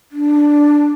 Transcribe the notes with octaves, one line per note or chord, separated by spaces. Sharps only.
D4